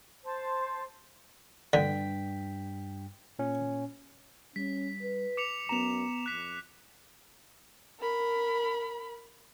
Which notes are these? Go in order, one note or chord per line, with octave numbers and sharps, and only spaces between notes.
C5 A5
G2 D3 G5 B6
A#2 C#4
G3 C#4 B6
B4
D6 C#7 F7
F#2 B3 A#5 E7 F7
F2 F#6 B6
A#4 B5